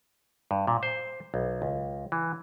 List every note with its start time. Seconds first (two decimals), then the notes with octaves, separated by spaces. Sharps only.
0.51 G2
0.67 A#2
0.83 C5
1.34 B1
1.62 C#2
2.12 E3